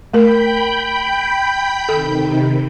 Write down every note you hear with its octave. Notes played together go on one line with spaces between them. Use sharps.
A3 A#4 G5 B5 G6
C3 D#3 A4